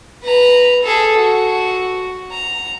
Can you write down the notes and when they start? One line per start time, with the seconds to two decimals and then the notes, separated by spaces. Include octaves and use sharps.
0.23 B4 A#5
0.83 G#4 A4
1.17 F#4
2.31 A#5